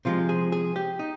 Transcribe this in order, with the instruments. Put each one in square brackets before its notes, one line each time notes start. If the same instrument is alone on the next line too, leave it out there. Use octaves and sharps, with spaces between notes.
[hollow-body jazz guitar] C3 F3 G#3 F4
G#4
G#4
G4
D#4